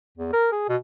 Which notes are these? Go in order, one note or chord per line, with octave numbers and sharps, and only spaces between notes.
E2
A#4
G#4
B2